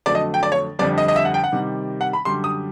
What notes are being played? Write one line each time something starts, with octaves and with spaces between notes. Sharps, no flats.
F2 D3 F#3 A3 D5
D#5
G5
D5
C#5
F2 D3 G3 D5
D#5
D#5
E5
F#5
G5
F#5
C3 D#3 G3
F#5
B5
F#2 D3 G3 C6
D#6